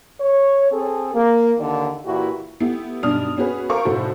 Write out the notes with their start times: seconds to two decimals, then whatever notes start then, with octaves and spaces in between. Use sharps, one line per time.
0.20 C#5
0.71 C4 G#4 A4
1.14 A#3
1.58 D#2 D3 D#3 A#3 D5
2.05 A#2 E3 E4 F#4 G4
2.60 A3 B3 E4 G4
3.03 B1 G2 D4 D5 D#6 F6
3.37 B3 C#4 F#4 G#4 B4
3.69 A4 A#4 C5 F5 C#6 D6
3.85 F1 A2 F#4 A4 C5